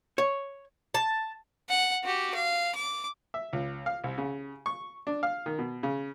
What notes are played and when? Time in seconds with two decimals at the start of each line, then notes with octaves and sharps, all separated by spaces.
0.18 C#5
0.94 A5
1.69 F#5
2.04 F#4 G4
2.35 F5
2.75 D6
3.34 E5
3.53 C#2
3.86 F5
4.04 C2
4.18 C#3
4.66 C#6
5.07 D4
5.23 F5
5.46 D#3
5.58 B2
5.83 C#3